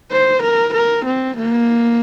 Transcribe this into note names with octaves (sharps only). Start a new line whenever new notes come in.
C5
A#4
A#4
C4
A#3